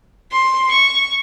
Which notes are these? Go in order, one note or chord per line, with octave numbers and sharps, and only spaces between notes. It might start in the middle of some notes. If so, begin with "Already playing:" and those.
C6
C#6